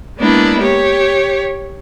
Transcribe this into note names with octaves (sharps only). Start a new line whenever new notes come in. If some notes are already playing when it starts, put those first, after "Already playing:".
G#3 A#3 B3 D4 E4
G4 C#5